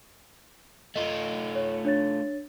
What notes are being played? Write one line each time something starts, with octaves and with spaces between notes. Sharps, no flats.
A3 F4 D#5
C#5
D4 C#5 A6